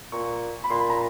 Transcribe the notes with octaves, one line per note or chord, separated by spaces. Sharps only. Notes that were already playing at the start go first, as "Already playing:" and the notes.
A#2 C#6
B5
A#2 C6
B5
A#5